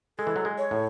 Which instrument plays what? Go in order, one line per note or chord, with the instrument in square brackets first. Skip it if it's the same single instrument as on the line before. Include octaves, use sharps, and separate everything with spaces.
[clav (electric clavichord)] G#3 [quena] A4
[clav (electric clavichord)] E3
F#3
G#3
[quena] C#5
[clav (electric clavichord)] A2